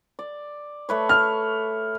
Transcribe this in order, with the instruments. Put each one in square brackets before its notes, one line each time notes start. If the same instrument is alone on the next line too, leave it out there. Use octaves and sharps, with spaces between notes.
[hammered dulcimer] D5
A3 B4 C#5
[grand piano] F6